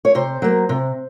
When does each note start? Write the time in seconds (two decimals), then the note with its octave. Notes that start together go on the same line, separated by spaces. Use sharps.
0.05 C#5
0.15 C3 C5
0.42 F#3 A#3
0.69 C3